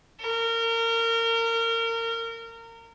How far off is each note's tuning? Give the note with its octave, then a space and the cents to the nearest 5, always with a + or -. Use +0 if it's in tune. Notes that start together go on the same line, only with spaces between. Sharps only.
A#4 -25